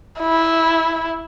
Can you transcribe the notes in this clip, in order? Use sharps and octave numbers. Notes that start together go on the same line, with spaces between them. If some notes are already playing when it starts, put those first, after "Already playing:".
E4